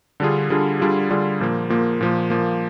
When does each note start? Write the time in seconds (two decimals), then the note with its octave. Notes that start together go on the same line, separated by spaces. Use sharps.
0.20 D3 G3 D4 F4 G#4
0.50 D3 G3 D4 F4 G#4
0.80 D3 G3 D4 F4 G#4
1.10 D3 G3 D4 F4 G#4
1.40 A#2 F3 A#3
1.70 A#2 F3 A#3
2.01 A#2 F3 A#3
2.30 A#2 F3 A#3